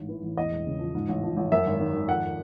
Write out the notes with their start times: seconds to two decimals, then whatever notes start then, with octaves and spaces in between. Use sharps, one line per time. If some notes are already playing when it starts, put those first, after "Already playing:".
Already playing: A1 G#2
0.09 E3
0.23 A1
0.37 E2 D#5
0.51 E1
0.66 C#3
0.79 F3
0.94 G#2
1.09 A1
1.23 F3
1.37 A1
1.52 F#2 E5
1.66 G#1
1.80 D#3
1.94 G#1
2.08 F2 F#5